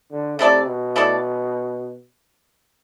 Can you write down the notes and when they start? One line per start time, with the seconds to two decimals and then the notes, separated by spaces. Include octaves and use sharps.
0.11 D3
0.39 C3 A3 E4 A4 D5
0.67 B2
0.96 A3 E4 A4 D5